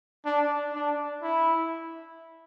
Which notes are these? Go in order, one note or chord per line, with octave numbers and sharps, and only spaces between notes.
D4
D4
E4